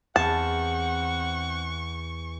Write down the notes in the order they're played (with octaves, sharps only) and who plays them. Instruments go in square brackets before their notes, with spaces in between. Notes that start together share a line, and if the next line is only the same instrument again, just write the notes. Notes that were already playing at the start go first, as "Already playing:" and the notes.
[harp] E2 [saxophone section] C4 F#5 [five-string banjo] A5 [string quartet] C#6